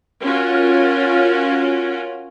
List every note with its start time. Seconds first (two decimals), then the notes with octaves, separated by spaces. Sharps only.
0.21 C#4 F4 F#4 A#4